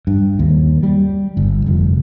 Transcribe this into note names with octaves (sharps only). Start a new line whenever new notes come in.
G2
D#2
G3
G1
F1